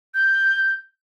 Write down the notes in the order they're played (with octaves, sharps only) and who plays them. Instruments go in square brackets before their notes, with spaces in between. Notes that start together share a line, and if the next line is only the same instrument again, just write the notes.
[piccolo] G6